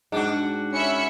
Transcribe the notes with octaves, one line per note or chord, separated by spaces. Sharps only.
G#2 D4 F#4
C#4 E5 B5 C#7